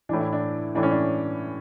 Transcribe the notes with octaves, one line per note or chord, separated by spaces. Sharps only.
A2 E3 D4
E4
D4
A2 E3 D4
C#4
D4